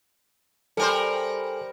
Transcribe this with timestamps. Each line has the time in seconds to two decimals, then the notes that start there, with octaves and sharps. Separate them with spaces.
0.77 G3 A4 A#4 C5 G#5